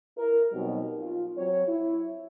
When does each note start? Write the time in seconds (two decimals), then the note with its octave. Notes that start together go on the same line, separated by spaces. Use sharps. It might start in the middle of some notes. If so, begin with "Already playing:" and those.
0.18 E4 A#4
0.52 B2 F#3 G3 C4 D#4
0.98 F4
1.36 F#3 C4 C#5
1.67 E4